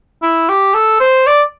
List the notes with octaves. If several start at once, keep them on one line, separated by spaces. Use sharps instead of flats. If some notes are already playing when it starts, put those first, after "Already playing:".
E4
G4
A4
C5
D5